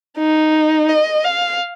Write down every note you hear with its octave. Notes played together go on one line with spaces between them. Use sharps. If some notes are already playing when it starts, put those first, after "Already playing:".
D#4
D#5
F5